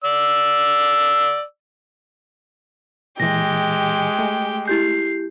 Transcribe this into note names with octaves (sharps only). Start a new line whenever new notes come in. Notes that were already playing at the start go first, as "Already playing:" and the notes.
D5 E6
A#2 E3 G#3 G4 G5 A#6
A3
E4 G4 G6 C7